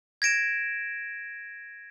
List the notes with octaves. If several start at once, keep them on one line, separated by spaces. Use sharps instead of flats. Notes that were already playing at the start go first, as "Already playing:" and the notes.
G#6 A#6 D7 E7